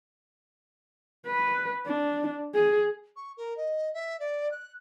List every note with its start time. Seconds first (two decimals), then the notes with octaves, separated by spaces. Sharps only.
1.26 B4
1.86 D4
2.55 G#4
3.16 C#6
3.37 A#4
3.57 D#5
3.93 E5
4.20 D5
4.51 F#6